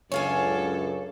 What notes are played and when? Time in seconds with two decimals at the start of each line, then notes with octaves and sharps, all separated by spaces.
0.12 C#2 F#2 C#4 D4 A4 C#5 F5 G#5